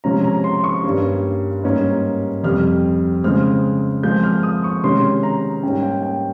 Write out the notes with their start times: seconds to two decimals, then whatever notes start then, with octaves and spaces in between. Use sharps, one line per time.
0.04 C3 F3 G#3 C#4 A#5
0.24 A#5
0.44 C6
0.64 C#6
0.84 G2 G3 A#3 C#4
1.64 G#2 G3 A#3 C#4
2.43 F2 C3 G3 F6
3.24 C#3 G#3 C4 F6
4.03 A#2 F3 G#3 C4 G6
4.24 F6
4.43 D#6
4.64 C#6
4.83 C3 D#3 G#3 C#4 C6
5.23 A#5
5.63 G#2 G3 A#3 C#4 G5
5.83 G5
6.03 G5